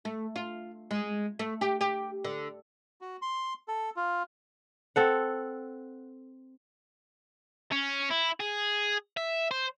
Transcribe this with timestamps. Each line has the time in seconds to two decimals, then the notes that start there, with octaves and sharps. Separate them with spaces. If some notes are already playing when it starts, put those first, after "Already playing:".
0.05 A3
0.36 F4
0.91 G#3
1.39 A3
1.61 G4
1.81 G4
2.24 D3
3.01 F#4
3.22 C6
3.68 A4
3.96 F4
4.96 C4 A4 F#5
7.72 C#4
8.10 E4
8.40 G#4
9.17 E5
9.51 C5